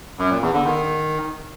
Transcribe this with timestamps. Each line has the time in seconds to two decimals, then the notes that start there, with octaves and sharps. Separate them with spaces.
0.19 F#2
0.30 A#2
0.42 E2
0.53 D3
0.65 D#3